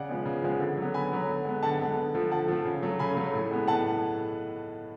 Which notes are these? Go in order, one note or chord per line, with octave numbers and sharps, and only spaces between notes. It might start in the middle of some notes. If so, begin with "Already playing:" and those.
Already playing: C#3 D5 F#5
F3 G#3 B3
C#3
F3 G#3 B3
D3
F#3 B3
D3 G#5 B5
F#3 B3
D3
G#3 B3
D3 F#5 A5
G#3 B3
D3
F3 A3
D3 F#5 A5
F3 A3
C#3
F#3 A3
C#3 G#5 B5
F#3 A3
A2
G#3 B3
A2 F#5 A5